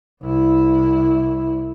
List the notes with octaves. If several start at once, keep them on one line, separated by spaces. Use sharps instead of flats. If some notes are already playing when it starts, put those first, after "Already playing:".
C2 E4